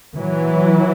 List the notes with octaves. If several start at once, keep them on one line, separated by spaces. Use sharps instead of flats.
A#2 E3 F#3